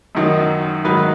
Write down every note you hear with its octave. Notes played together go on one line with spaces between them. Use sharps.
F#2 D#3 F#3 D#4
G#2 D#3 F#3 D#4 B4